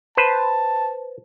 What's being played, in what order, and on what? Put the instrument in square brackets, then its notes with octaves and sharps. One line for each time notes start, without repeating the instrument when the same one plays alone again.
[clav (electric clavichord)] B4 C5 [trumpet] A5